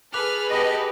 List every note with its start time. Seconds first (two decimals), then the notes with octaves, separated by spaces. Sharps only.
0.14 G#4 A4 B4 D6 F6 F#6 F7
0.50 B3 G4 D#5 A5 B5 A#6